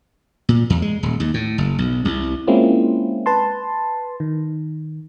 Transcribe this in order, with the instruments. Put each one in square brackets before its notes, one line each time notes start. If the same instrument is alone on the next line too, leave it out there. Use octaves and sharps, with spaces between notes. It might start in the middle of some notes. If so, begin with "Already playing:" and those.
[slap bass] A#2
E2
G#3
D#1
D#2
A2
F#1
B1
C2
[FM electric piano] G#3 A#3 C4 C#4 E4 F4
B4 A5 C6
D#3